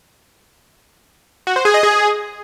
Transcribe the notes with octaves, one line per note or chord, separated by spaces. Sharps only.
F#4
C5
G#4
D#5
G#4